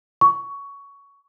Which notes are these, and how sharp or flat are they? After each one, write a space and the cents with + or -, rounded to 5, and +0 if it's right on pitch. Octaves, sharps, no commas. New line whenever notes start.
C#6 +15